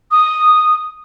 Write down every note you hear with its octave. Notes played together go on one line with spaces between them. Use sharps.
D#6